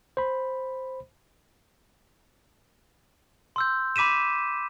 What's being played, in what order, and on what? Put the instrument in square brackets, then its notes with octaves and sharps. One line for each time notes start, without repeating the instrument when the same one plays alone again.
[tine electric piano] C5 B5
[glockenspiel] C6 E6 G6
B5 D6 B6 D#7 E7